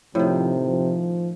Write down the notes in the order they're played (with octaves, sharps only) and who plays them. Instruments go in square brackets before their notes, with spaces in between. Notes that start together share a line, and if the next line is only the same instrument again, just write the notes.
[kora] A2 D#3 [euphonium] C3 [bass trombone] F3
[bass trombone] F3